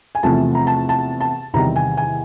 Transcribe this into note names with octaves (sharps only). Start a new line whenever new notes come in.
G#5
E2 C3 F3 A3 A5
A#5
A5
A5
A5
E2 C3 D#3 G3 C4 A#5
G#5
G#5